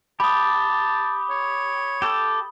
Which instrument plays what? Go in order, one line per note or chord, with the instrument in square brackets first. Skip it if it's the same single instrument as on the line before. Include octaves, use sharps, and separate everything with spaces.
[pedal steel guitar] G4 [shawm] A5 [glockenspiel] B5 D#6
[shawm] C#5
[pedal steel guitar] G4 A4